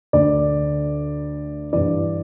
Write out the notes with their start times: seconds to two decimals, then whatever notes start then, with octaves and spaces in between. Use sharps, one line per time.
0.13 D2 D3 D5
1.73 G2 E3 D5